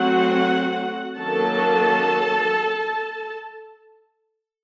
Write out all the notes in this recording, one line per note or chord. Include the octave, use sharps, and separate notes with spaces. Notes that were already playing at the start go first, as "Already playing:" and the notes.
Already playing: F#3 A3 C4 F#4 F#5
D#3 F#3 A#3 C#4 A4 A5